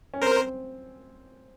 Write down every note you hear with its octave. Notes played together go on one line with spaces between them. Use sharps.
C#4
C4 A#4 C5
C4